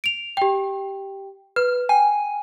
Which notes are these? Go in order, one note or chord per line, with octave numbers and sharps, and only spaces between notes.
D7 F7
G4 G5
B4 F6
G5 G#5